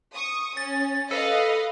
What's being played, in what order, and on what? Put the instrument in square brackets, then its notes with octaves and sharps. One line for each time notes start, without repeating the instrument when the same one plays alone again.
[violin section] C#6 D#6
[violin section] C#4 [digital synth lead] A6
[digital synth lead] A4 [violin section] B4 D#5 F5